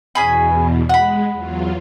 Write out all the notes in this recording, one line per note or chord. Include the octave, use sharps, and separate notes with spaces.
E2 B2 C#4 G#4 B5
G#3 F#5 B5
E2 F#3 F4